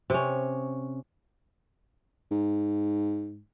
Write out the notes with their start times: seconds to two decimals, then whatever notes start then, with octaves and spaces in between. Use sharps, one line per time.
0.10 C3 C#4
2.31 G#2